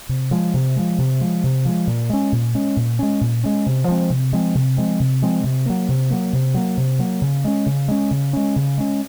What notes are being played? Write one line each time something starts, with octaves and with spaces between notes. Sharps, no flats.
C3
F3 G#3
C3
F3 G#3
C3
F3 G#3
C3
F3 G#3
A#2
G#3 C#4
A#2
G#3 C#4
A#2
G#3 C#4
A#2
G#3 C#4
C3
F3 G#3 C4
C3
F3 G#3 C4
C3
F3 G#3 C4
C3
F3 G#3 C4
C3
F#3 A#3
C3
F#3 A#3
C3
F#3 A#3
C3
F#3 A#3
C#3
G#3 C#4
C#3
G#3 C#4
C#3
G#3 C#4
C#3
G#3 C#4